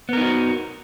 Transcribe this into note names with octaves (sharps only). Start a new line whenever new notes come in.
B3 D#4 F#4 A#4